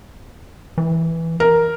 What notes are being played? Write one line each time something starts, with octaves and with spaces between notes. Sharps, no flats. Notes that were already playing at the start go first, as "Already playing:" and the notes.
E3
A#4